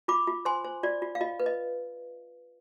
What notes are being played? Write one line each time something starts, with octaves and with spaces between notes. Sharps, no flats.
F4 B5 D6
F4
C5 G#5 C6
C5
F4 D5
F4
F5
F4 D#5
B4
D#5